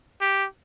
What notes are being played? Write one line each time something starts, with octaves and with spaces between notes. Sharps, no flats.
G4